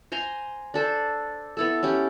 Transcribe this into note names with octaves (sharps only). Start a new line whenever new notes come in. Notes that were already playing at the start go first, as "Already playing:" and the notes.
C5 G#5 A#5 C6
D4 A4 C5
B3 E4 A4
C#4 E4 G4